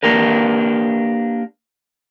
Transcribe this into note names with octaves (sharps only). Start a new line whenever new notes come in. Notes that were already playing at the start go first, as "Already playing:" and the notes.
A#3 D4 G4 A#4 B4